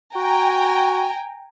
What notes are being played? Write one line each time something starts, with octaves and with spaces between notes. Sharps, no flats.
F#4 G5 G#5 A#5